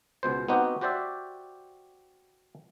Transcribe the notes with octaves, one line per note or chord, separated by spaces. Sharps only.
C#2 B2 C5
B3 C4 D#4 F#4 G4
F#4 G4 C5 D5 E5